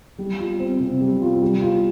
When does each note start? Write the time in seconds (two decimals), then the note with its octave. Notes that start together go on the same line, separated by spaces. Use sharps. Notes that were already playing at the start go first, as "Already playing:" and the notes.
0.19 G3
0.39 F4
0.60 C4
0.80 C3
1.01 G3
1.22 F4
1.41 G3
1.62 F4